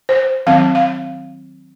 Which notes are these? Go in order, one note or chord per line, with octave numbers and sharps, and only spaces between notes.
C5
D#3 F#3 C4 F5
F5